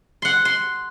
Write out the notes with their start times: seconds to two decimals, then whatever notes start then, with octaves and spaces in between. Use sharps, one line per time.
0.22 F#5 C6
0.45 C6